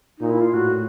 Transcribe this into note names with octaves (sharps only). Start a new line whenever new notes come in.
A#2 D#4
E4
F4
A2 F#4